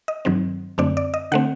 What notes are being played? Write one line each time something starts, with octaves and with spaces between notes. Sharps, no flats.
D#5
G2 D#3 F#3 C4
F#2 D3 A3 C4 D5
D5
D#5
D3 A3 C4 F#5